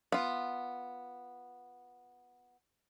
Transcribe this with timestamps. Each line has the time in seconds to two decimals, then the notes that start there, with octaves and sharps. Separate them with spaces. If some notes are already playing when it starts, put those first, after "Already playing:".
0.12 B3 F4